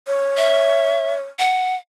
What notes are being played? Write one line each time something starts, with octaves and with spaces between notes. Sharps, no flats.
C#5
E5
F#5